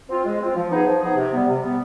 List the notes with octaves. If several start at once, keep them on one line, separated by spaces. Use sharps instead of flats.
C4 F4
G#3
C4 F4
F3
B3 D#4 G#4
F3
B3 D#4 G#4
C3
G3 B3
C3
G3 B3